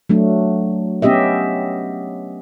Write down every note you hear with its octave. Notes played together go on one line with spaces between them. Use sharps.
F#3 A3 D4
B3 C#4 G4 D#5 E5